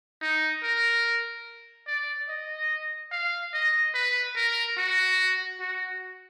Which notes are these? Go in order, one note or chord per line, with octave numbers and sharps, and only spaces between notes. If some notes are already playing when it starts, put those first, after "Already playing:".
D#4
A#4
D5
D#5
F5
D#5
B4
A#4
F#4
F#4